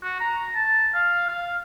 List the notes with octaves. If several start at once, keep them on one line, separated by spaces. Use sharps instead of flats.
F#4
A#5
A5
F5
F5